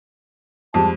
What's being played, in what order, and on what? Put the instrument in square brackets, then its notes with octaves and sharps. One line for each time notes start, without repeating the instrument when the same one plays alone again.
[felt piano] F2 G3 G#3 [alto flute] A5